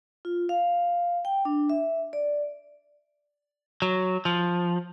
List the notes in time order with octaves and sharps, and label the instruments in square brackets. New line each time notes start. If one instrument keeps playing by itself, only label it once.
[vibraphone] F4
F5
G5
D4
E5
D5
[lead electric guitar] F#3
F3